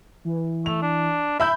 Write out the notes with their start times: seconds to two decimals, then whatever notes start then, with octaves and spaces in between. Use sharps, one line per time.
0.25 E3
0.66 A3 F7
0.82 D4
1.40 E4 E5 B5 G6